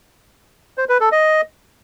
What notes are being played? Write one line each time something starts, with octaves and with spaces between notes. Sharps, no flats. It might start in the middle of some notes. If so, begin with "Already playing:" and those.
C5
B4
A4
D#5